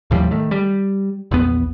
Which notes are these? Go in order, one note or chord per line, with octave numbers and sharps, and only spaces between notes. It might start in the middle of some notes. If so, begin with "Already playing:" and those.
D#2 A2 F3 G3
D#3 A3
G3
A#1 E2 B3